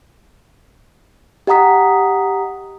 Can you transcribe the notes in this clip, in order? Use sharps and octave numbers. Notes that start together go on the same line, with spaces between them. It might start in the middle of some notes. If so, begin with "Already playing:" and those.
G4 D#5 F#5 A#5 D#6 B6